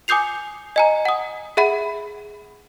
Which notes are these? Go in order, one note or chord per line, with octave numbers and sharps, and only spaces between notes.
G#5 D6 D#6 G6 C7 F7
D#5 G#5 A#5
F#5 D#6
G#4 E5 F#5 B5